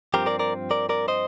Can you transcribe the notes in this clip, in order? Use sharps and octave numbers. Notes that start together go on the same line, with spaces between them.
G2 F3 C4 G4 A#4
A#4 D5
A#4 D5
A#4 D5
A#4 D5
C5 D#5